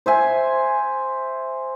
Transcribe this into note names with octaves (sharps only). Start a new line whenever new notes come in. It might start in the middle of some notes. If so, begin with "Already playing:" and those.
C5 E5 G#5